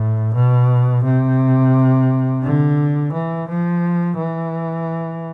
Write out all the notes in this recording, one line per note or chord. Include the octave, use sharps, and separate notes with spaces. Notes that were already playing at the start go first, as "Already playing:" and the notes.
Already playing: A2
B2
C3
D3
E3
F3
E3